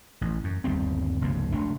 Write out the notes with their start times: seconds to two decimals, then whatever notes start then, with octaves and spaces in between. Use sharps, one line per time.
0.21 A1
0.44 F#2
0.64 G1 D#2 G3 C4
1.21 F1 C#2 G2 A#3
1.52 F1 A3 D4